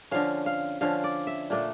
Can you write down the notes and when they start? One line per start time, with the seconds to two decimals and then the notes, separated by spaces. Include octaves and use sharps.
0.11 D3 F3 C#4 F5
0.46 F5
0.81 D3 F3 C#4 F5
1.04 D5
1.27 E5
1.50 A#2 A3 D4